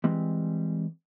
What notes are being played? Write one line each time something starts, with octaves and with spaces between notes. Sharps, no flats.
E3 G3 G#3 C4